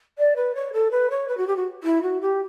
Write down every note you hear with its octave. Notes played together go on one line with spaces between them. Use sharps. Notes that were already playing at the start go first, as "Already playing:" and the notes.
D5
B4
C#5
A4
B4
C#5
B4
F#4
G4
F#4
E4
F#4
G4